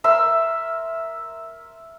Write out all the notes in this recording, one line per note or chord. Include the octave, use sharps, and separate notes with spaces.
A#4 E5 C6